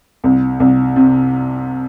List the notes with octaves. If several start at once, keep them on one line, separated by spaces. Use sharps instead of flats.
C2
C2
C3